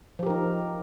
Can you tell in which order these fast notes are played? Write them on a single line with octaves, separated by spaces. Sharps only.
F3 G4 A#4 D#4